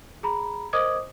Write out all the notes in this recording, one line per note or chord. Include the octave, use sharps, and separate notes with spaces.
G#4 A#5 B5
A#4 C5 D#5 D6 D#6 G#6